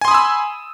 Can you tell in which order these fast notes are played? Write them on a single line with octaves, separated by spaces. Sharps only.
G#5 C6 D#6 B5 E6